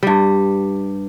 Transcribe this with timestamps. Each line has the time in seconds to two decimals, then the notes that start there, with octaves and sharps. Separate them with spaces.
0.03 G2 G3